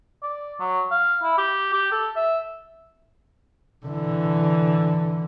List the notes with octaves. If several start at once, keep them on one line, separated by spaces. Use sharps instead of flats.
D5
F#3
F5
E4
G4
G4
A4
E5
D3 E3